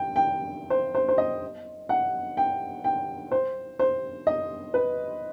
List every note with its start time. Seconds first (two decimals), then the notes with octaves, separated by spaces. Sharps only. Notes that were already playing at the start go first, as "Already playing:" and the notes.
Already playing: G5
0.16 G5
0.70 C5
0.95 C5
1.08 C5
1.18 D#5
1.89 F#5
2.37 G5
2.84 G5
3.31 C5
3.79 C5
4.27 D#5
4.74 B4